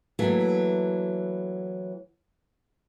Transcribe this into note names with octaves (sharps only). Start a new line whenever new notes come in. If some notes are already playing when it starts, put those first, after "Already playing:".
E3 F#3 A3 A#3